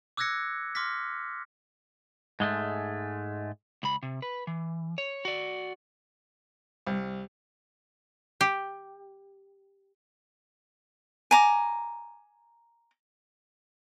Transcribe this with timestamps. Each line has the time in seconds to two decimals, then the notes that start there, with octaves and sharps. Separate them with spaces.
0.17 D6 E6 F#6 G#6 A#6 C#7
0.75 C6 D6 F6 A#6 B6
2.40 G#2 G#3 A3
3.83 C#2 B5
4.03 C3
4.22 B4
4.47 E3
4.98 C#5
5.25 F#4 D5
6.87 C2
8.41 G4
11.31 G#5 A#5 D6